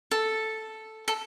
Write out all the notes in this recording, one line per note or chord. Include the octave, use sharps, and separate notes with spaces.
A4
A4